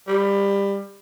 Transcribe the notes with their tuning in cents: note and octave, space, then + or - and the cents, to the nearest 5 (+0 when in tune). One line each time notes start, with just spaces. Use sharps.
G3 +20